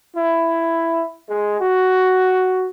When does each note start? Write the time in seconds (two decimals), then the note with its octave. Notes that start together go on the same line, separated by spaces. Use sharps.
0.16 E4
1.29 G#3
1.60 F#4